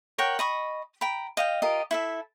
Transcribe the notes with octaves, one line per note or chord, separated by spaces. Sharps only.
A#4 C#5 F#5 G5
D#5 B5 C#6
G5 A#5 B5
D#5 F5 G5
F4 G4 A#4 D#5
E4 A4 E5